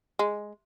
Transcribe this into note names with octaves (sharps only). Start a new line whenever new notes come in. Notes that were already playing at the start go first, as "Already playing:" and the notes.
G#3